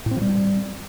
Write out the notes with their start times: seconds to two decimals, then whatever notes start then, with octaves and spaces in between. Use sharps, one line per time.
0.06 A2
0.11 C4
0.16 F3
0.22 G3